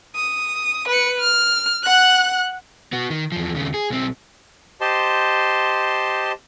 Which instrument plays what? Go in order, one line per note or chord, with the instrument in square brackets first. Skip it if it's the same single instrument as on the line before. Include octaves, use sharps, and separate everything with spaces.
[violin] D#6
B4 C#7
F6
F#5 F#6
[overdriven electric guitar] B3 F#4
D#3
E2 F3
D#2 C#3
G#4
B1 C4
[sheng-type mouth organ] G4 C5 D#5 A5 C6